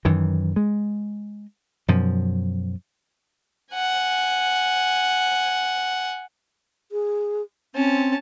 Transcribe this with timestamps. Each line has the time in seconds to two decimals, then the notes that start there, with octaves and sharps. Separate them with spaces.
0.05 F#2 D#3 E3
0.56 G#3
1.88 F#2 B2 F3
3.74 F#5 G#5
6.92 G#4
7.75 C4 C#4 A5